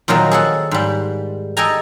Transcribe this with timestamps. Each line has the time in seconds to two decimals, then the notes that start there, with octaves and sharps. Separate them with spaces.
0.08 A#2 D#3 F3 F#3 A#3
0.31 G#4 A4 F#5
0.71 G#2 G3
1.57 A4 D#5 G5 G#5 A#5